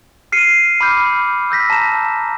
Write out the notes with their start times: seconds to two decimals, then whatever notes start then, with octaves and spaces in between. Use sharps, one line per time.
0.32 F6 C7 C#7 D#7
0.81 B5 D6 F6 G6
1.51 E6 G6 A#6 B6
1.70 A5 A#5 E7